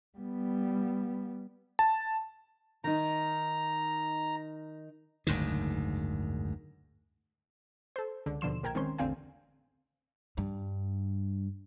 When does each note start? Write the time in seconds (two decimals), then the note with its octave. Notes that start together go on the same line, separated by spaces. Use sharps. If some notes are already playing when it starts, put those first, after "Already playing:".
0.18 G3 B3
1.79 A5
2.84 D#3 D#4 A#5
5.27 F#1 D2 G#2 D#3
7.96 A4 C5
8.26 C#2 D3
8.41 D#2 B2 D3 F3 C6 E7
8.63 A#1 A#4 G5 A#5 G#6
8.75 D#3 G#3 C4 C#4 C5 C6
8.98 A1 E2 D3 C4 F5 G#5
10.38 G2